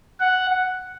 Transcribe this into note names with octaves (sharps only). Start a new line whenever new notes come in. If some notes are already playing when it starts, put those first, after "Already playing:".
F#5